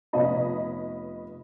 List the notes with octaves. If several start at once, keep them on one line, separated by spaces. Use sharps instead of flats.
F1 B3 C#5 D#5 B5